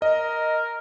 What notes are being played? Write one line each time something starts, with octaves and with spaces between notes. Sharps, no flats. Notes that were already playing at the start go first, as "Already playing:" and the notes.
A#4 D#5